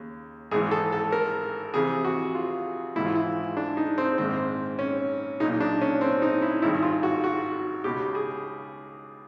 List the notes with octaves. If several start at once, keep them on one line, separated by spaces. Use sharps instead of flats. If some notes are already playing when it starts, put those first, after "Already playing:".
Already playing: D#2 C#3
G#1 G#2 E3 G#4
A4
A4
A#4
F2 C3 E3 G#4
F#4
F4
G#1 G#2 E3 E4
F4
E4
D4
D#4
C4
A#1 G#2 D#3 C4
C#4
B1 A#2 D#4
D4
C#4
C4
D#4
E4
G#1 G2 D#3 E4
F4
F#4
F#4
C#2 B2 G4
G#4